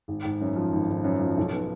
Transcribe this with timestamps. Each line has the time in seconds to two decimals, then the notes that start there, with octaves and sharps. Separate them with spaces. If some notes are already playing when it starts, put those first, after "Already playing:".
0.08 G#1
0.24 G#1
0.41 F#2
0.56 F3
0.73 G#1
0.89 G#1
1.04 F#2
1.21 F3
1.38 B1
1.53 B3